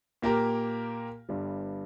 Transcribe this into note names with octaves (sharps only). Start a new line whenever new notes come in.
A#2 A#3 G4 A#4
G1 G2 G3